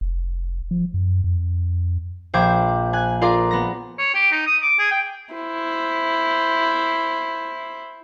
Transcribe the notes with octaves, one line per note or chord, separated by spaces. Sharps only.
F1
F3
F#2
F2
A#1 C5 G5 D6 G#6
G#5 F#6 G#6
F4 G#4 A#4 D5 C6 D6
B3 A#6
C#5
G4
D#4
D#6
D6
G#4
G5
E4 C5